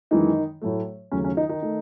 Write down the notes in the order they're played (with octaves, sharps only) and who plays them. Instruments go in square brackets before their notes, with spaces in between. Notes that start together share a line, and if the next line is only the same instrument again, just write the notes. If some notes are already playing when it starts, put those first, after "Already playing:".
[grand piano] F#2 D#3 E3 G#3 D#4
A2 F#3 A3
D#2 C#3 F#3 A3 C#4
C#4
D#3 D#4
D#3 D#4
D#3 A3